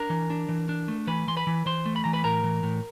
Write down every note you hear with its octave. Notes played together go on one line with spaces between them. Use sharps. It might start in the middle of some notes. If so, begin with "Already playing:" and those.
Already playing: D4 A#4 A#5
E3
D4
E3
D4
A3
E3 B4 B5
E3 C6
B4 B5
E3
E3 C5 C6
A3
B5
E3 A#5
B4 B5
A2 A#4 A#5
E3
A2